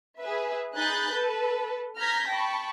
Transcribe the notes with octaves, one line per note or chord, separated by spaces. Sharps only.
G#4 B4 E5
D#4 G#4 B5 F#6 G6 A6
A4 B4
A#5 F6 G6 G#6 A#6 B6
G5 A5 B5 C#6